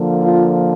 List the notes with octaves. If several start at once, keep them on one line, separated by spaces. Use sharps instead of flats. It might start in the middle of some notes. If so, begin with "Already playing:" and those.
Already playing: D3 F3 A#3
F4